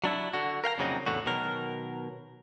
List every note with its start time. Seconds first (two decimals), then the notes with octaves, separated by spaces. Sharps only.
0.04 F#3 D4 E4
0.33 D3 F#4
0.64 A#4 F5 G5 A#5
0.78 F2 A#2 C#3 F#3 C4 D#4
1.06 E2 A2 D3 F#4
1.26 B2 D#3 F#3 A#4